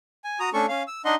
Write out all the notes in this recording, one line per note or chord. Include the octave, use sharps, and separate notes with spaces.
G#5
F#4 A#5 D#6
A3 C#4 D4 A4 C#6
C#4 F5
E6
D4 D#4 D#5 F#5 C6